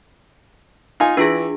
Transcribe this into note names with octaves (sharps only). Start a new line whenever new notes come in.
D#4 F4 G#5
E3 D4 F4 G#4